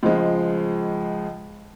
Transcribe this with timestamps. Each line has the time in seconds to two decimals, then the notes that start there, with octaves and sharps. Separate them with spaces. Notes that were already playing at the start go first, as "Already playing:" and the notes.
0.03 C#2 F3 G#3